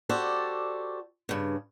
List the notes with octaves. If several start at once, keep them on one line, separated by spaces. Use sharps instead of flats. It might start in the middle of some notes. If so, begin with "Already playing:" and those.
F#4 G4 A4 C5 D5
G2 C#3